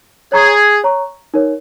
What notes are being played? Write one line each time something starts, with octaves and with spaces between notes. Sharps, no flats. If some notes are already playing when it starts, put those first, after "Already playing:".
G#4 C#5 A#5 C#6
C#5 A#5 C#6
D#4 A#4 C#5